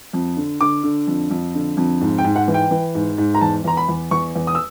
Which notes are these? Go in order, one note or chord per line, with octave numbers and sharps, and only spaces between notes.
F2
D3
D3 D6
D3
F2
F2
D3
F2
G#2
G5
G#2
F#5
E3
G5
E3
G#2
G#2
A#5
E2 A5
E2 A#5
B5
E2
E2 C#6
E2
D#6
E6